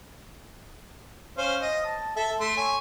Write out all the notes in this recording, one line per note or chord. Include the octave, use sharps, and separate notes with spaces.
C#4 C5 F5
D#5 D#6
A5
A4 E5
A3 C6
C#5 G#5